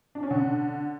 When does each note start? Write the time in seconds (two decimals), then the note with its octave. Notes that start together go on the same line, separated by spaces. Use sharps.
0.15 D4
0.23 C#4
0.31 D3